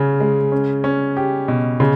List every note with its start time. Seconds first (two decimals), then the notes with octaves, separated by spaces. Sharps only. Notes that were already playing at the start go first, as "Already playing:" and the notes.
Already playing: C#3 C#4
0.20 G#3
0.52 C#4
0.84 C#4
1.17 G4
1.48 B2
1.80 C#3